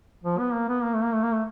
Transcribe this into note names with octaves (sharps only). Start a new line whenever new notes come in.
F3
B3
A#3
B3
A#3
A3
A#3
A3
A#3
A3